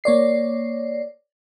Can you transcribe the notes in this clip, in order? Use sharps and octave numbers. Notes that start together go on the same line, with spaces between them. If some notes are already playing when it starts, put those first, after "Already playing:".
A#3 C#5 D5 C7